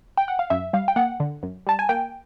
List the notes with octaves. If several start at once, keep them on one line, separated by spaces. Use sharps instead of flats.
G5
F#5
F5
F#2 E5
G3 F5
G5
A#3 F#5
D3
F#2
G3 A5
G#5
A#3 G5